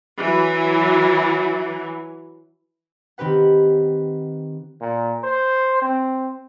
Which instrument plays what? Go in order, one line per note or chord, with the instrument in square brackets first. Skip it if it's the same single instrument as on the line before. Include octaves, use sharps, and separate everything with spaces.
[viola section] E3 F#3
[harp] D#3 C4 G4 B4 F#5
[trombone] A#2
C5
C4